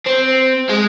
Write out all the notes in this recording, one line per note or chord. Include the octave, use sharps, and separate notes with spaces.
C4
G#3